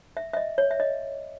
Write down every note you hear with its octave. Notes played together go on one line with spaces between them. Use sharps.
E5
E5
D#5
C#5
E5
D#5